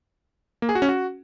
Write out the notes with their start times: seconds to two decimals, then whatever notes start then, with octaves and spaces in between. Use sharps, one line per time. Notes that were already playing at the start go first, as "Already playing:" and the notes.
0.62 A#3
0.69 G#4
0.75 F#4
0.82 C#4
0.89 F#4